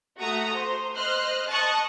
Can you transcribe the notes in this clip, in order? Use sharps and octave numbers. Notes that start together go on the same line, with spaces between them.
A3 F#4 A#5 D#6
C5
C5 D#5 F6 F#6
D#5 A5 C#6 D#6 F#6